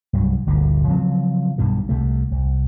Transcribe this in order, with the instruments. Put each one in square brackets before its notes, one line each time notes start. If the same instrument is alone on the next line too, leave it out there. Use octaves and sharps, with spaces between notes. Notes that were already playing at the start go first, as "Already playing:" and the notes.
[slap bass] C2 G2 F#3
G1 D2 A#2 D3
C#3 F3 F#3 C4
B1 G2 B2 D#3
C2 C3 A3
C2